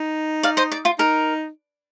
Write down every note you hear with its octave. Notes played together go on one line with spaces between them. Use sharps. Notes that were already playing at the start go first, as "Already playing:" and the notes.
Already playing: D#4
D5 F5
C5 D#5
D5
F4
D#4 A#4